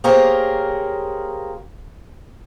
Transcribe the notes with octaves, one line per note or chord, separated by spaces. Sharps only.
A#3 G4 G#4 A#4 C5 C#5